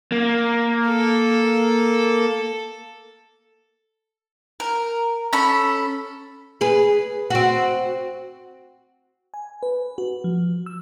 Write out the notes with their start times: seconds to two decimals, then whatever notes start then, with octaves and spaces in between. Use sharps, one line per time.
0.12 A#3
0.87 A4
4.60 A#4
5.33 C#4 A4 B5
6.61 G#4 B4
7.30 C4 F#4
9.34 G#5
9.63 B4
9.98 F#4
10.24 F3
10.66 E6